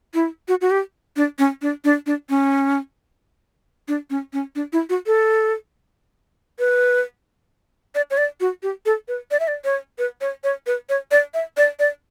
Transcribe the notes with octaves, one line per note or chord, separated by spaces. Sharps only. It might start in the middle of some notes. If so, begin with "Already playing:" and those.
E4
F#4
F#4
G4
D4
C#4
D4
D4
D4
C#4
D4
C#4
C#4
D4
E4
F#4
A4
B4
D5
C#5
D5
F#4
G4
A4
B4
D5
E5
D5
C#5
B4
C#5
C#5
B4
C#5
D5
E5
D5
D5